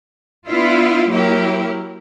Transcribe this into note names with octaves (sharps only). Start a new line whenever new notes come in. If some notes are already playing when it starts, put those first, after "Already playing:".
B3 D4 E4 F4
F#3 A#3 E4 G4 A#4